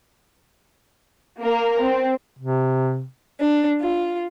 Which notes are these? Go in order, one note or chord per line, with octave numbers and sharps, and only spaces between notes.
A#3 A#4
C4
C3
D4
F4